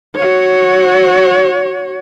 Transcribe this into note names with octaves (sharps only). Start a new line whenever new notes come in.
F#4 C#5